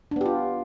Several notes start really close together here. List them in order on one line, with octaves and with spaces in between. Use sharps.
D4 B3 G4 F4